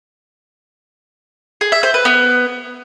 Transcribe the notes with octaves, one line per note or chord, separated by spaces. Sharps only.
G#4
E5
C5
B4
B3